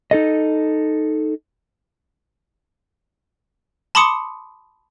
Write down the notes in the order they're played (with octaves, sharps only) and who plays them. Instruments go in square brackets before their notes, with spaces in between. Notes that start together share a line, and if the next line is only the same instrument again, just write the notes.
[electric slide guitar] D#4 A4 D#5
[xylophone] A5 B5 C6 D6 D#6 C#7